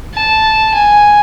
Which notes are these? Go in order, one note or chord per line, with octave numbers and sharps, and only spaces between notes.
A5
G#5